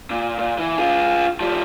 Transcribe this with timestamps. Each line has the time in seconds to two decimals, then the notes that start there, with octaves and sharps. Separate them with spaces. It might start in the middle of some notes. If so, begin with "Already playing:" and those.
0.10 A#2
0.38 A#2
0.58 E3
0.78 F4 G#4
1.41 F3 G3